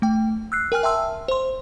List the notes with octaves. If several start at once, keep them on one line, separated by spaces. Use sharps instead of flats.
A3 G5
E6 F#6 C7
A#4 G5 G#5 F6
E5 G5 A5 C6 E6
C5 C6